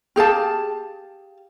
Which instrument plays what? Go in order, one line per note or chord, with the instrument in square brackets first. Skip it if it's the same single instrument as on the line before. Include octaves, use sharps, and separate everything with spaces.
[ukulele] G4 G#4 F5 A5